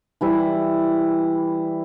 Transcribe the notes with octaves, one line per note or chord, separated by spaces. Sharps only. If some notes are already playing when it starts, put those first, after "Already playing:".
E3 G3 E4